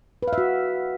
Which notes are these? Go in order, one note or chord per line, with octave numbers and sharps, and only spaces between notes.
B4
F5
E5
F#4